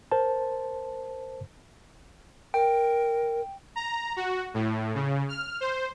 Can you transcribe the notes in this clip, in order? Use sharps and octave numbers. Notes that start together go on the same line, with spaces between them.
A#4 C5 A5
A#4 G5
A#5
F#4
A2
C#3
F6
C5